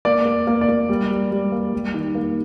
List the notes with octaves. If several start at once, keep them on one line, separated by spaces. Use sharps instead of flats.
A#3 D5
A#3
A#3
D5
A#3
G3
G3
G3
A#3
G3
D#3
A#3